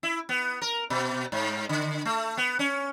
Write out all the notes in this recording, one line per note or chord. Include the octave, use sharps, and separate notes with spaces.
E4
B3
A#4
B2
G#2
D3
A3
B3
C#4